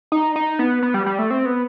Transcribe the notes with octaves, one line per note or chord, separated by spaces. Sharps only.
D#4
D#4
B3
B3
G3
G3
A3
C4
B3